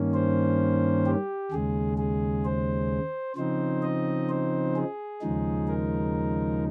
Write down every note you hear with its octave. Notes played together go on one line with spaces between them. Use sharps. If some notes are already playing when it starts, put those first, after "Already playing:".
Already playing: G2 D#3 A#3 C#4
C5
G4
D#2 C#3 G#3 G#4
G#4
C5
C#3 F3 C4 D#4 C5
D#5
C5
G#4
D#2 C#3 F3 G#3 D#4
A#4